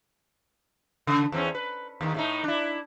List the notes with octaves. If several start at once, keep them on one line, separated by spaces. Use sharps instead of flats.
C#3
E2 C4 C#4
B4
D#2 D#3
A2 A3 D#4
D4 E4